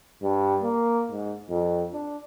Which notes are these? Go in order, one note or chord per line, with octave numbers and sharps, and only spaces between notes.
G2
A#3
G#2
F2
D4